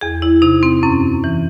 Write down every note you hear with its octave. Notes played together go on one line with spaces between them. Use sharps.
E2 G#4
E4
C3 D#4
C4
F#2 C#4
E3